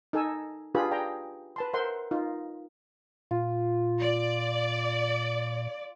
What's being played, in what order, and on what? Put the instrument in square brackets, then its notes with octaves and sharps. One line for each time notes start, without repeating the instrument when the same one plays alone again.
[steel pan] D#4 A4 G#5 E6
D4 F4 G4 G#4 B4 B5
G#4 D5 G5 A#5
B4 A5 C6
A#4 C5 E5 F#5 C6
D#4 F4
[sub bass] A#2 [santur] F4
[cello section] D5